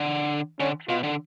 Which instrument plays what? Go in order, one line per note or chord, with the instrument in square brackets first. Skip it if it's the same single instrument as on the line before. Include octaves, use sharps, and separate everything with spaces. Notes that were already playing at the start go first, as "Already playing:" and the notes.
Already playing: [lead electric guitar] D3
[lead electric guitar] D3 [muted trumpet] C#4
[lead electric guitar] B2 [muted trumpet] F4
[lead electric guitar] D3